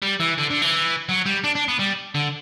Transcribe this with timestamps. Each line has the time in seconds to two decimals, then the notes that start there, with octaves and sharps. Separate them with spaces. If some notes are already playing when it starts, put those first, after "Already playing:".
0.02 G3
0.20 E3
0.38 D3
0.50 D3
0.62 E3
1.09 F#3
1.26 G3
1.44 D4
1.55 D4
1.68 B3
1.79 G3
2.15 D3